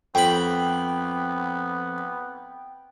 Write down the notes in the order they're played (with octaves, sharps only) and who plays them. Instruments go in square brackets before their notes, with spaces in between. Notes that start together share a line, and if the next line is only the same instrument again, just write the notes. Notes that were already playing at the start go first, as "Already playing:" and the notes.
[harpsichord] F2 B5 [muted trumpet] B3 [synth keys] G5